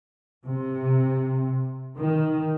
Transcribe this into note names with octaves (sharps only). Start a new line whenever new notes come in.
C3
D#3